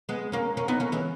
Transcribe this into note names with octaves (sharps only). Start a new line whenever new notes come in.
G#3 B3
A#3 C#4
A#3 C#4
B3 D#4
A#3 C#4
E3 G#3